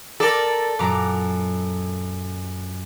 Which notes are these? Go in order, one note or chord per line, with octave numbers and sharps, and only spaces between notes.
A4 A#4 D5
F#2 A#2 F#3 A#5 D6